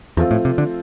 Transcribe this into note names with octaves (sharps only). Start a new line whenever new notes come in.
E2 F3 A3 C4 F4
A2
C3
D3